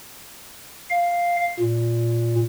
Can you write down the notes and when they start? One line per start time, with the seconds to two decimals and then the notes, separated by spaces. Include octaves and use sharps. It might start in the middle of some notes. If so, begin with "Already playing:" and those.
0.90 F5
1.60 A#2